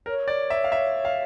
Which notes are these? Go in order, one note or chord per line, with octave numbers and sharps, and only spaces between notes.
A#4 C#5
D5
E5
F5
E5
F5